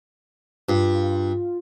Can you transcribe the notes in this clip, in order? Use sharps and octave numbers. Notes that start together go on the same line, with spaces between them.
G2 F4